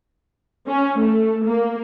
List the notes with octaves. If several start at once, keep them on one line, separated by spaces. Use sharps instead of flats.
C#4
A3
A#3